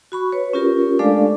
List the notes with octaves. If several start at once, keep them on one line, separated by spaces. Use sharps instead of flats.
F#4 B5 C#6
B4 C#5
C#4 F4 G4 A#4
G#3 A3 D4 A4 D5 F5